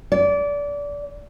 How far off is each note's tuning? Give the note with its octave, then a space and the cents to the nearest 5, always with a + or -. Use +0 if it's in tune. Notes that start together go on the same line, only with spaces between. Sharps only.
D5 -25